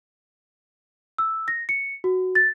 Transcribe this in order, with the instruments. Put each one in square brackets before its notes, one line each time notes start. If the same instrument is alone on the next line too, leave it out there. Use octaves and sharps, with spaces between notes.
[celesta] E6
A#6
C#7
F#4
A6